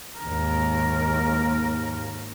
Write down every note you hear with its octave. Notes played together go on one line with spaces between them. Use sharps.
D#2 G#2 A#4